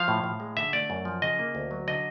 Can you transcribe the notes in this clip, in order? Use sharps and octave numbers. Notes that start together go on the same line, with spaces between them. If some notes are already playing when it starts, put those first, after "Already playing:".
Already playing: F3 F5
A2
A2
G#3
D3 E5
A3 D5
F#2
F3
C#3 D#5
A#3
D2
F#3
D3 D#5